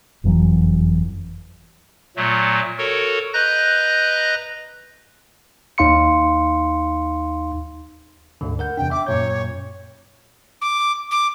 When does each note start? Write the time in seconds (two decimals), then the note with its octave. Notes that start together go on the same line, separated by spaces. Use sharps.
0.24 F#1 F2 E3 F#3
2.17 A#2 F#3 A3
2.78 F#4 A4 A#4 C#5
3.34 B4 D#5 A#5 F#6 G6 A#6
5.78 D#2 D#4 F5 C6 C#7
8.41 D2 G#2 D3
8.59 A#4 F#5 G6
8.77 E2 C3 D4 G5
8.91 E5 D6
9.07 F#2 A#2 C#5 G6
10.62 D6
11.11 D6